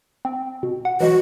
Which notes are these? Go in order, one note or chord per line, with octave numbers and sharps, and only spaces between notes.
C4
B2
F#5
E3 F#3 G#3 F#4